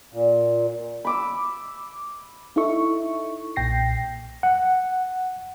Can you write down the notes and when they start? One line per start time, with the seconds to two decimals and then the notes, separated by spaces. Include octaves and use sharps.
0.13 A#2
1.05 B5 D6 E6
2.56 D#4 E4 A4 E5 C#6
3.56 B1 A#2 G5 A#6 C7
4.43 F#5